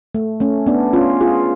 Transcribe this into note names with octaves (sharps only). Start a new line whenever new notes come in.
A3
A3 C#4
B3 D4
C#4 F4
F4 G#4